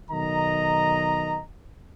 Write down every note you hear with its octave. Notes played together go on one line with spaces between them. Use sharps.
B1 D#3 D#5 A#5